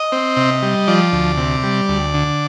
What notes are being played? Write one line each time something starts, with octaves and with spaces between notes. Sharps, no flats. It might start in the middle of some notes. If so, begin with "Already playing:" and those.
Already playing: D#5
C4
C3
G3
F3 D5
D2
C3
G3
D2
D3